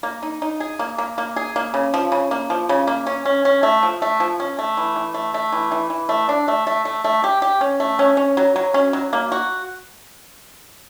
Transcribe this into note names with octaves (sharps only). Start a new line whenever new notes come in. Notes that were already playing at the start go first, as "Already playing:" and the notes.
A#3
D#4
D#4
G#4
A#3
A#3
A#3
G#4
A#3
C#3
F3
C#3
A#3
F3
C#3
A#3
C#4
C#4
C#4
A3
F3
A3
F3
C#4
A3
E3
E3
A3
A3
E3
E3
E3
A3
D4
A3
A3
A3
A3
G4
G4
C#4
A3
C#4
C#4
F#3
F#3
C#4
F#3
A#3
F#4